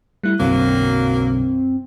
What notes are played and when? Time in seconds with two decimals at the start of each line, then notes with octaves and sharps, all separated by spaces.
0.23 G3 A3 E4 F#6
0.40 B1 F#2 D3 F#3 A#3 C4